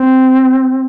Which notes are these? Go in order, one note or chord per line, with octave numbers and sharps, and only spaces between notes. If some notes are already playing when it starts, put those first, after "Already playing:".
Already playing: C4